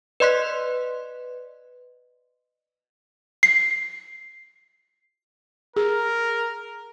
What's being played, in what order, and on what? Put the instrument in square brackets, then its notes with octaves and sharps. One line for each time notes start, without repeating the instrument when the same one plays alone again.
[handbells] B4 D5 D#5 C6 F#6 B6
[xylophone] C7
[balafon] G#4 [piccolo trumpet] A#4